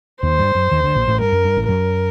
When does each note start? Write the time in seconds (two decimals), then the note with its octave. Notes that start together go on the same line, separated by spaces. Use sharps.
0.22 D#2 D#3 C5
0.39 G2 G3
0.55 F#2 F#3
0.71 D#2 D#3
0.84 D2 D3
0.95 A#1 A#2
1.08 A1 A2
1.20 G2 A#4
1.32 F#2
1.44 G2
1.57 A1 A2
1.68 F#2 F#3 A#4